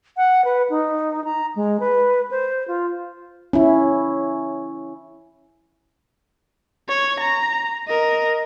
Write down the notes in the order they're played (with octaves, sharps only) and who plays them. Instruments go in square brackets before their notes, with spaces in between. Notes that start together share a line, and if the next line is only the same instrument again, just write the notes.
[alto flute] F#5
B4
D#4
A#5
G#3
B4
C5
F4
[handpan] C#4 E4
[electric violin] C#5
A#5
A#4 D#5